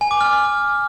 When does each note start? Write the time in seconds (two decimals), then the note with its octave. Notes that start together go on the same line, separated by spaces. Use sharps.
0.01 G#5
0.11 D6
0.21 F6